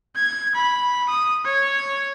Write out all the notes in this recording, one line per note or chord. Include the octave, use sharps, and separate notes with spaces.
G#6
B5
D#6
C#5